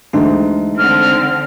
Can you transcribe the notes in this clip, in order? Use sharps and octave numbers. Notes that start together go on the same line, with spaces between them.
D2 E3 G#3 D#4
D3 C4 F6